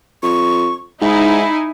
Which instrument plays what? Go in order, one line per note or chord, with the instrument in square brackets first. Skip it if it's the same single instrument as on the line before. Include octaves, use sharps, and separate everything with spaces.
[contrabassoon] F2 [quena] C#6
[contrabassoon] G#2 [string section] D#4 E4 G#5 [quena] E5